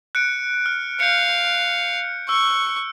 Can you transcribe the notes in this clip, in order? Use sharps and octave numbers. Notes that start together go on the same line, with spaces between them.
F#6 C#7 D7
F6
F5 G6 C#7
C#6 E6